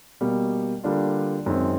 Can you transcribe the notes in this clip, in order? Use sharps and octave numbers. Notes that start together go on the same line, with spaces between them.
B2 G3 A#3
D3 G3 A#3 D4 F4
F#2 D#3 G#3 C4